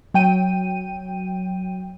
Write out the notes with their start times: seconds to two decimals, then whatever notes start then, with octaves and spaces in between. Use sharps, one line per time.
0.14 F#3 G5 D#7